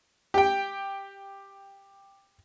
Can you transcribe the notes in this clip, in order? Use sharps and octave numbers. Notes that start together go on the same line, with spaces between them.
G4 G5